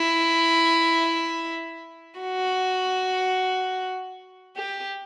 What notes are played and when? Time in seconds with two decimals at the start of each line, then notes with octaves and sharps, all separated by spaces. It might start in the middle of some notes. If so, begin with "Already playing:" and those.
Already playing: E4
2.20 F#4
4.57 G4